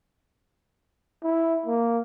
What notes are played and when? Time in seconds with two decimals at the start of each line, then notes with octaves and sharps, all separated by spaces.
1.23 E4
1.66 A#3